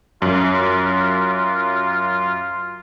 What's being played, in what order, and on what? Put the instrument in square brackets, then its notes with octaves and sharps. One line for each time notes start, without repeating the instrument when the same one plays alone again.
[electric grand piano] F#2 [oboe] F4